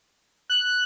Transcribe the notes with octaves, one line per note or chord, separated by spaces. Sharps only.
F#6